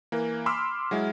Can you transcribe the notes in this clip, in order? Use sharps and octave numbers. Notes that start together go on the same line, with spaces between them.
E3 A#3
B5 C6 D6 E6 F6
F#3 G#3 E4